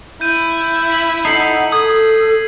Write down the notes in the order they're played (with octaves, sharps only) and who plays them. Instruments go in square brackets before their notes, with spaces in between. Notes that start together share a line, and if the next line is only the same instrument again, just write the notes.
[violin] E4 [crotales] G6 D#7
[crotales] B6 F#7
[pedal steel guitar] D#4 A4 [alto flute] F#5 [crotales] C7 F#7
[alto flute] A4 [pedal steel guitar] D#6 [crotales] G#6